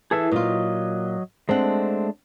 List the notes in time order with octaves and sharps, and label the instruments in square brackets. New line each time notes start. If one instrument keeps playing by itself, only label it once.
[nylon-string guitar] E3 [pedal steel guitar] G#4 A4 E5
[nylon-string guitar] A#2 F4 [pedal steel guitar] F#3 D#5
[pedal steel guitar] G#3 A3 D4 [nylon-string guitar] C4 F#5